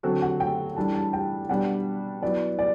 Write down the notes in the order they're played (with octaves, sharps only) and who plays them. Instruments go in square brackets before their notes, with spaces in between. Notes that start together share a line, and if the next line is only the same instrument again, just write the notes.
[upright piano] D3 F#3 C4 F#4 A4
[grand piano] F#5
G5
[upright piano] E3 G3 D4 A4 [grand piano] A5
[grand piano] A5
G5
[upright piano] B2 G3 D4 G4 [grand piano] F#5
[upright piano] F#3 B3 E4 [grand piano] D5
[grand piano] D5